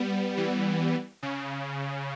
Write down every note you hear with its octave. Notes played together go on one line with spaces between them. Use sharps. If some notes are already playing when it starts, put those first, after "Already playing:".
Already playing: G3 B3
E3 G3
C#3